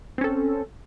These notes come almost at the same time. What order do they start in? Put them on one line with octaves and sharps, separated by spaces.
C4 C#4 A4